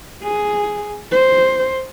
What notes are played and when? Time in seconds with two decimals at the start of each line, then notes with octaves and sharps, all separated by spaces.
0.22 G#4
1.11 C5